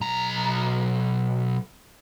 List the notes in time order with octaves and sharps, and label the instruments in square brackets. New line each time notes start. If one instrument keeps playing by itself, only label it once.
[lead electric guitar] B1 A#5